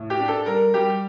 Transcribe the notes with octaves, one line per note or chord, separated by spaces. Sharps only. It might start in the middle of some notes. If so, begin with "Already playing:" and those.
Already playing: A2
G4
D4
A4
G3 A#4
G3 G4